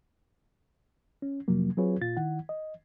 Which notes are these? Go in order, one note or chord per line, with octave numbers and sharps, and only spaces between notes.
C#4
F2 C3 F3 F#3 A#3
F#3 C4 F4 G#4 B4 C#5
A#2 F4 A6
D#3 E4 F#5
D#5